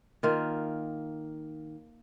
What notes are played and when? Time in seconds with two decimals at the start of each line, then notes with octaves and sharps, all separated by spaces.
0.23 D#3 A#3 F4